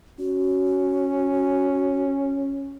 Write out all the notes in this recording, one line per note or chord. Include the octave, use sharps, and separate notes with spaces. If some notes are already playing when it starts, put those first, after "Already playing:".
C#4 F#4